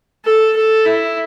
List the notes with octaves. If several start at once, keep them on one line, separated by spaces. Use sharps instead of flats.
A4
A4
E4